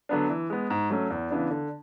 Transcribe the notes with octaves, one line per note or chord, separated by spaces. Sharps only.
D3 F#3 B3 D4
E3
G#3 B3
G#2
F#3 A3 C#4
E2
C#3 E3 B3 D4
D3